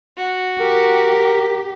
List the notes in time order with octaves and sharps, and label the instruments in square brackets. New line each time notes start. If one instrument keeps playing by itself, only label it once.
[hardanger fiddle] F#4
[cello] G4 [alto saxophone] A#4